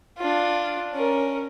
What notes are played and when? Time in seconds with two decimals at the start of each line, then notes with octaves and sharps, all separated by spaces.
0.18 D4 F4
0.93 C#4 A#4